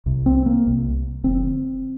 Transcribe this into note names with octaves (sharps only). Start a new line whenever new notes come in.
C2 C3
C4
A#3
C2 C3
F1 F2 D3 C4